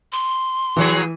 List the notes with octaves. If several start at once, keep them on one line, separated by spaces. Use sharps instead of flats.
C6
B2 E3 F3 G#4